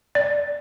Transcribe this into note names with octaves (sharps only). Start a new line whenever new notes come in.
D5